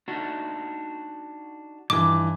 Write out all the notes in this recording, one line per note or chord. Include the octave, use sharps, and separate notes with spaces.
D4 D#4 F#4
G2 D#3 E3 D6